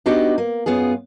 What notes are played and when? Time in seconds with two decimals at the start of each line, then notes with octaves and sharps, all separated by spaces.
0.06 B3 D4 D#4 F#4 G4
0.38 A#3
0.66 F#2 B3 F4 G#4